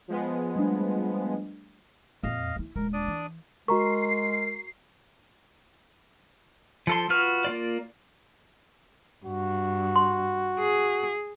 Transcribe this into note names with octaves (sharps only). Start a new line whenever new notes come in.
F3 G#3 B3
G3 A3 D4
F2 A#2 D#5 F5 F6
D#4 E4
D#1 G#3 A#4
D4 D5 D#6
E3
G#3 F#4 A#4 A#5 C#6 C7
F3 A4 C6
F4 F#4 B4 F6
A#3 F4 D5
G2 F#4
C6
G#4